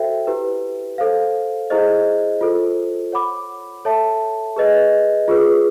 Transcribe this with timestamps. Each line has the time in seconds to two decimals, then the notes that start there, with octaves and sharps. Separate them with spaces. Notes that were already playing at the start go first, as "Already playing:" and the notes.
Already playing: F#4 A4 C5 E5 G5
0.27 E4 G4 B4
0.98 A4 C5 F5
1.70 E4 G#4 C5 D#5
2.41 F4 A4 C5
3.12 C#5 F#5 B5 D6
3.85 A4 C#5 E5 A5
4.56 G#4 B4 D#5
5.28 F4 G#4 B4